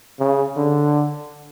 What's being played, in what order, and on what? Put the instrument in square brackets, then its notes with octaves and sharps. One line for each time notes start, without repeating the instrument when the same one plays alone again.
[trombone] C#3
D3